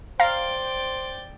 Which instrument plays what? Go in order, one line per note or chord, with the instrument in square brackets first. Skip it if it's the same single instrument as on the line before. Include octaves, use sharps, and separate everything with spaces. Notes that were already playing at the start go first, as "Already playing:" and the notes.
[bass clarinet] C5 [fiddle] D5 G5 [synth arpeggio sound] F5 A#5